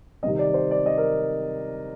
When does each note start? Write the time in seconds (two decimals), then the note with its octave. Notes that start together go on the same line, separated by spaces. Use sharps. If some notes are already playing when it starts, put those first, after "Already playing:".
0.23 C3 D#3 G3 C4 D#5
0.39 D5
0.54 C5
0.71 D5
0.86 D#5
0.98 A#4